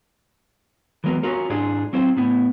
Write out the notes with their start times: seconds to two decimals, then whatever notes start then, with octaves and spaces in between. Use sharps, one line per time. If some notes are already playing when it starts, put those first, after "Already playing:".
1.04 E3 F#3 G#3 B3 A#4
1.23 C#4 F4 F#4 A#4
1.50 G#2 D4 E4 F4 G#4
1.93 F#3 C4 E4 F4 C5
2.17 A2 B3 E4